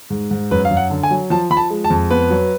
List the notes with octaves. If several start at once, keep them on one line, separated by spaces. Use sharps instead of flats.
G#2
G#2
F#2 B4
F5
F#2
F#5
D3
G#5
F#3
F3 A5
F3 B5
A5
G#3
A5
F2
B3 B4
F#3